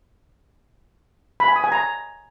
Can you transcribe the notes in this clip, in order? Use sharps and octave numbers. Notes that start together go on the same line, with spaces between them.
B5
G#5
D#6
G#5
A#5